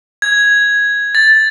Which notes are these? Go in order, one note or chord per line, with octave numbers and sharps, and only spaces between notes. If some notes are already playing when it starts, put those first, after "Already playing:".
G#6
A6